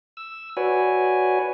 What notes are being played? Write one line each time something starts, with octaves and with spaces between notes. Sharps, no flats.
E6
F#4 B4 C#5 D5 G#5